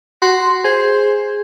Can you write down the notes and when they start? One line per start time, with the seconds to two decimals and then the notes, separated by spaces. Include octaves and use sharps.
0.22 F#4 C6
0.64 G#4 C5